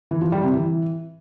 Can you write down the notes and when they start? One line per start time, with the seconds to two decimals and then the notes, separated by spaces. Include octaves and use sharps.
0.11 E3
0.22 F3
0.32 G3
0.43 C3
0.53 E3